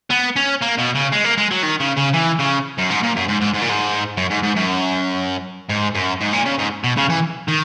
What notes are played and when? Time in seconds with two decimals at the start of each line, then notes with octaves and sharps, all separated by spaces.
0.11 B3
0.36 C#4
0.62 A#3
0.78 B2
0.95 C#3
1.12 G#3
1.25 A#3
1.38 G#3
1.51 F#3
1.63 D#3
1.80 C#3
1.97 C#3
2.14 E3
2.39 C#3
2.78 F#2
2.90 G#2
3.03 A#2
3.16 F#2
3.28 G#2
3.41 G#2
3.54 G#2
3.62 A#2
3.69 G#2
4.17 F#2
4.30 G#2
4.43 G#2
4.56 F#2
5.69 G#2
5.95 F#2
6.21 G#2
6.33 A#2
6.46 C#3
6.59 G#2
6.84 B2
6.97 C#3
7.10 E3
7.48 D#3